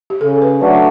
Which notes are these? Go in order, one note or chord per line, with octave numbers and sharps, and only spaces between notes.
G4
C#3 A4
B4
F#3 A3 D4 F#4 B4